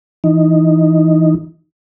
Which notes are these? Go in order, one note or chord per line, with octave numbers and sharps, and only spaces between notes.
E3 D#4